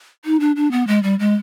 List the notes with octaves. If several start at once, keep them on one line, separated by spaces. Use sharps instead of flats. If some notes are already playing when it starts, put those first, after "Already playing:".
D#4
D4
D4
B3
G#3
G3
G#3